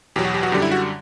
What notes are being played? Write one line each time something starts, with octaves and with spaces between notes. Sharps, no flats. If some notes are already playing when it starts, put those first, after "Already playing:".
E2 B2 F#3 G4
F#4
G4
F#4
F#2 D3 G3 G4
E4
F#4